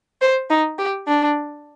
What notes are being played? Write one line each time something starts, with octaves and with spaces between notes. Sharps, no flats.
C5
D#4
G4
D4